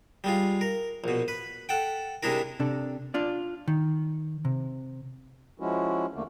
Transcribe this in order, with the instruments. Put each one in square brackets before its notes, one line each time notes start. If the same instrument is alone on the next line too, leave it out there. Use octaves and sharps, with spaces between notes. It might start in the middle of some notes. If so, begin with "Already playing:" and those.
[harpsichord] G3 G#3 F4
A#4
A#1 B2
B4
A4 F#5 G5
C3 G#3 D4 E4 A#4
[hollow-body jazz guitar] C3 D4 A4
D4 F4 D5
D#3
C3
[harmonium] F3 G#3 C#4 E4 F#4
E2 D3 A3 A#3